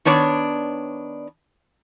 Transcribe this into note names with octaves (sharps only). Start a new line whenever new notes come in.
D#3 B3 D4 C#5 D5